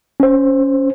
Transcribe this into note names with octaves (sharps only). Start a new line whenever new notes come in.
C#4 C5